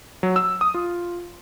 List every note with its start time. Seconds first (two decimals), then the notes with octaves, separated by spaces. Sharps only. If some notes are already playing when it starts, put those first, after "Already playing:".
0.23 F#3
0.36 E6
0.61 D#6
0.74 F4